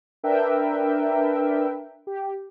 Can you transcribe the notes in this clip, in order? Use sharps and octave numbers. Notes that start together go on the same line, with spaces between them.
D4 A#4 B4 E5 G5
G4